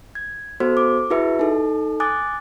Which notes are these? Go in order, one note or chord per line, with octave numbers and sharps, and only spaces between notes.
G#6
B3 F#4 A4 C5
D6
E4 F#4 G#4 B4 E5
D#4 A4
G#5 D6 D#6 F#6 A6